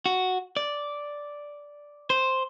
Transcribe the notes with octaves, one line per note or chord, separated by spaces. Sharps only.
F#4
D5
C5